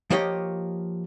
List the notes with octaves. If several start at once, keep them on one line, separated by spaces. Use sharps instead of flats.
F3 A#3 G4 C#5 D#5